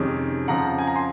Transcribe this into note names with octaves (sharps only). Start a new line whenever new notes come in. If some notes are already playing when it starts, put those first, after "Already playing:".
Already playing: F2 C3 D#3 G#3 C#4
F2 C#3 F3 C4 F#5 A#5
G#5
A#5
G#5 C6